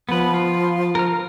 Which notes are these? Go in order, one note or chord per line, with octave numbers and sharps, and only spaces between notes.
F3 B3 B4
F4
A#4 F6